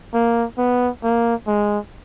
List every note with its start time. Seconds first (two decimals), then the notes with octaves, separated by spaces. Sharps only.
0.14 A#3
0.58 B3
1.03 A#3
1.47 G#3